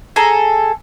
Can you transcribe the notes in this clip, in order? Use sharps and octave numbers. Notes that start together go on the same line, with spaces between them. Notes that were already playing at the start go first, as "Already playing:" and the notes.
G#4 A4 A#5